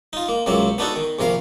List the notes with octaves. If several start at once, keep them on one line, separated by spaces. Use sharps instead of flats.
D#4 F4
A#3
C#2 C3 F#3 A#3 C4
B3 D4 D#4 F#4 A4
D#3
A#1 C3 A#4 F5